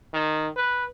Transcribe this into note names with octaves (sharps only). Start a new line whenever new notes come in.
D#3
B4